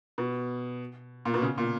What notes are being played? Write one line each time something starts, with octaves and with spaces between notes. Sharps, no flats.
B2
A#2
B2
C#3
A#2